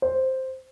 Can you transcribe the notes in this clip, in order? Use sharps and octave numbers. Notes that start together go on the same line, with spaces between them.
C5